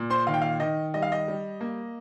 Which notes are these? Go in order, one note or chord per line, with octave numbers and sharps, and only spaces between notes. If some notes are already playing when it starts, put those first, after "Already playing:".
Already playing: A#2
C5 C6
D#3 F5
G5
F5
D#3 D#5
G3 D#5
F5
D#5
G3
A#3